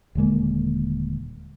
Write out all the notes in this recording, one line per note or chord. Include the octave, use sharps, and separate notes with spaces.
D#1 D3 G#3 A#3